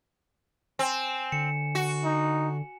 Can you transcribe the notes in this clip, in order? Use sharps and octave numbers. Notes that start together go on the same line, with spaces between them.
C4 G#5 E7
D3 C#7
F#4
D#4